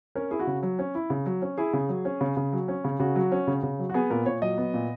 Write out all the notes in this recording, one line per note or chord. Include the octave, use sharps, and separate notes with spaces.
C#4 A#4
E4 G#4
F#4
C#3
F#3
C#4
E4
C#3
F#3
C#4
E4 G#4
C#3
F#3
C#4
C#3
C#3
F#3
C#4
C#3
C#3 F#4
F#3
C#4
C#3
C#3
F#3
F#4
B3 G#4
A#2 A#4
A#2 C#5
F#3 D#5
B3
A#2